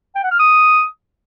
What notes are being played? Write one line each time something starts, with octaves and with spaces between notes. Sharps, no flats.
G5
F#5
F6
D#6